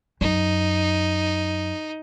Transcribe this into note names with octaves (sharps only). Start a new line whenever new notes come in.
F#2 D#4